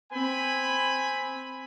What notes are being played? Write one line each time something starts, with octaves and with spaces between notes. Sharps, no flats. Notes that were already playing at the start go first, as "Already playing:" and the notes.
C4 G#5 B5